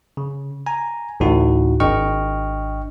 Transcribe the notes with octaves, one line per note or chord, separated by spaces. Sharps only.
C#3
G#5 A#5
A1 D2 A2 D#4 F#4
G#1 D4 D#5 G5 C#6 F6